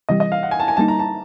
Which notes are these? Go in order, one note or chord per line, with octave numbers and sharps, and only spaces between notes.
C3 E3 G3 D#5
D#5
F5
F#5
G#5
A5
G#5
D3 G3 A#3 D#4 A5
A#5
A5